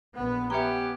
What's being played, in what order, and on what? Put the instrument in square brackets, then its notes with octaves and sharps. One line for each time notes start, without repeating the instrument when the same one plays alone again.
[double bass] A#1 B3 [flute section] B4 F#5
[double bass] B3 [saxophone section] C#4 G4 [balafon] E5 A#5